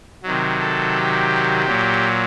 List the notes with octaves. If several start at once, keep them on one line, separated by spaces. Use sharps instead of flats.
C3 D#3 F#3
A4
G4
A#2 F#3